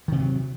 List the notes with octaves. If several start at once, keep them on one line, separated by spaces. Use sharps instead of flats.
C3 D#3 F#3 G3